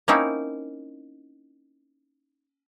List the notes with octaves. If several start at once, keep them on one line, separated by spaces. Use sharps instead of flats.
A#3 C4 C#4 D#4 E4